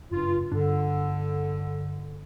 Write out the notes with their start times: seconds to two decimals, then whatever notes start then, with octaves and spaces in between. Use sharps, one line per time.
0.11 F#1 G2 F4
0.52 G2 D3 D4